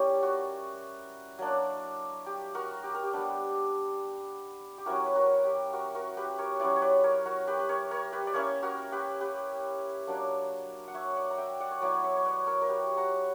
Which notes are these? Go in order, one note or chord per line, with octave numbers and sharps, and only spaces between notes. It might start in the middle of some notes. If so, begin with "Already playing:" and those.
Already playing: G3 C#4 E4 G4 A#4
F#4
F#3 A#3 D4
G4
F#4 A#4
G4
A#4
G4
G3 B3 D4
G4
F#3 C#4 E4 F#4 A#4
B4
F#4 A#4
G4
F#4 A#4
F#4 A#4
G4 B4
A#4 C#5
F#3 C#4 E4 B4 D5
C#5
B4 D5
A#4 C#5
F#4 A#4
G4 B4
B4
A#4 C#5
A#4 C#5
G4 B4
D5
A#3 C#4 E4 A#4 C#5
F#4 A#4
G4 B4
G4 B4
F#3 A#3 D4
F#5
C#5 E5
D5 F#5
A#5
E5 G5
D5 F#5
C#5
F#3 B3 E4 B4 D5
C#5 E5
C#5
B4 D5
A#4 C#5
A#4
G4 B4
F#5 A#5